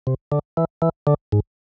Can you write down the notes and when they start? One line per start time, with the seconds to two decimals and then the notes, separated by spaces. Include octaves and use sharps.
0.07 C3
0.32 D3
0.57 E3
0.82 E3
1.07 D3
1.32 G#2